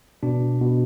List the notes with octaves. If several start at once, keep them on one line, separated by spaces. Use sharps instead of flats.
B2 D4
B2